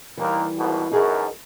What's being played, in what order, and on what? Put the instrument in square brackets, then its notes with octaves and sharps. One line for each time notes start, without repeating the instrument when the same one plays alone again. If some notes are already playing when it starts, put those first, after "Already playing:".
[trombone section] D#2 A#3 [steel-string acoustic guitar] E3 G3
[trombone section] G#1 B2
[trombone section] F#2 B2 [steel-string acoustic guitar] D#4 G#4 A#4